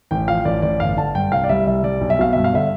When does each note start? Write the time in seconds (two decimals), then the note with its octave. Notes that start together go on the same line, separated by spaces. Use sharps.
0.11 A1 G5
0.28 F3 F5
0.45 A1 D5
0.62 A1 D5
0.80 G1 F5
0.97 D3 A5
1.15 G2 G5
1.32 C2 F5
1.44 D5
1.49 G3 E5
1.67 C2 E5
1.84 G3 D5
2.01 B1
2.10 E5
2.19 B2 F5
2.33 G2 E5
2.44 F5
2.53 D3 E5